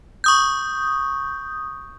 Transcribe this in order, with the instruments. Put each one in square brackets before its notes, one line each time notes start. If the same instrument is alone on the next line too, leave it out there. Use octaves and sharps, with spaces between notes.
[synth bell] C#6 D#6 G6